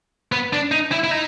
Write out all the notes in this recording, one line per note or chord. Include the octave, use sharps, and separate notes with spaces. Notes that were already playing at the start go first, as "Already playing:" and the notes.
B3
D4
D#4
E4
E4
D#4